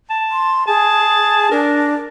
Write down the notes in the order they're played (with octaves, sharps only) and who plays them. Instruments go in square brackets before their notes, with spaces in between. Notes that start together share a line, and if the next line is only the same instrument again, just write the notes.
[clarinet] A5
[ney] C6
[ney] G#4 [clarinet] A5
[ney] D4 [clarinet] A#4